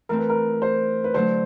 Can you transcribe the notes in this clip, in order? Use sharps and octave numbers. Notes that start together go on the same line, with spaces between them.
E3 A3 C4 A#4
B4
A#4
C5
B4
D3 F#3 A3 C5